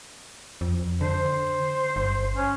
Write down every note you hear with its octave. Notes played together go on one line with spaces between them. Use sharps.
F2
D3 C5
G1
C#4